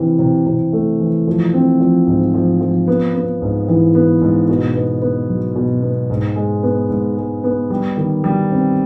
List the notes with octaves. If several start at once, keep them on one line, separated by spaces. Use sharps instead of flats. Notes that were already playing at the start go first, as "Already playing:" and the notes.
Already playing: C3 E3
C3
C3
A3
E3
F3
C4
F3
G#2
F3
F3
B3
B3
G#2
E3
B3
G#2
B2
B3
B3
F#3
B2
B3
G#2
G#3
B3
G#2
G#3
B3
G3
D#3
G3
C4